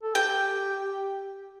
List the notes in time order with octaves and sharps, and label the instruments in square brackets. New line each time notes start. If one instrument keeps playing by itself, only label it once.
[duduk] A4
[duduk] G4 [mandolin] G5